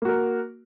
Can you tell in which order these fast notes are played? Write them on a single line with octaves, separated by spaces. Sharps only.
A#3 F#4 A#4